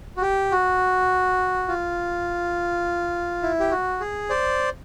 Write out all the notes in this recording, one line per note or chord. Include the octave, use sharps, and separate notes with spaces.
F#4
G4
F#4
F4
E4
G4
F#4
G#4
C5 D5